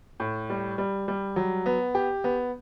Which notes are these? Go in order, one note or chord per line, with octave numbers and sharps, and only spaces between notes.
A2
G3
G3
G3
F#3
B3
G4
B3